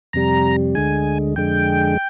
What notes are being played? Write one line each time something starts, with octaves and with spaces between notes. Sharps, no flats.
F2 C3 G3 A#5
D2 D3 G#3 G#5
F2 D3 G#3 G5